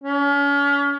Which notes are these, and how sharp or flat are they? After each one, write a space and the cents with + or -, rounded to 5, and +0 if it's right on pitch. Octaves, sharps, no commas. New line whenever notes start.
C#4 +35